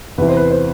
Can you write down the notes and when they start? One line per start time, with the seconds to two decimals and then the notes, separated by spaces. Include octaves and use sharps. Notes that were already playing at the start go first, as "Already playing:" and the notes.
0.18 E2 C3 E3 B4
0.28 C5
0.37 B4
0.51 C5